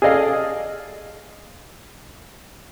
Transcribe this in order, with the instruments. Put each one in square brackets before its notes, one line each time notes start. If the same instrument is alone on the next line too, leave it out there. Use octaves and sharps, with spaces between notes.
[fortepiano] G#4 A4 D5 D#5 F5